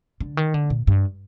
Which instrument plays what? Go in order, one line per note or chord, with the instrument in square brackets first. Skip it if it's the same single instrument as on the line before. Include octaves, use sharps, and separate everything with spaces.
[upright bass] D3
D#3
D3
A#2
G2